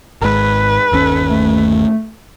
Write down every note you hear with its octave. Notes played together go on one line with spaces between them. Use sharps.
G#1 G#2 B4
G1 D#2 C#4 A4
A3